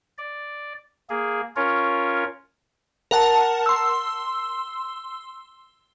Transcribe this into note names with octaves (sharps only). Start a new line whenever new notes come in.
D5
A#3 G#4
C#4 F4 A#4 C#5
A#4 F#5 A5
C6 E6